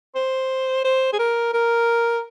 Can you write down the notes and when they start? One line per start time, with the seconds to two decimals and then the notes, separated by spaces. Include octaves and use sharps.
0.15 C5
0.85 C5
1.13 G#4
1.19 A#4
1.54 A#4